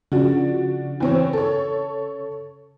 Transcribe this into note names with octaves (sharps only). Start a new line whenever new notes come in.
C#3 F3 D4 F#4
E2 C4 C#5
A4 C#5